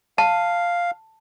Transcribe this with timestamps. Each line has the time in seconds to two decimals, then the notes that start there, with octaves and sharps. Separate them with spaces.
0.18 F5 A5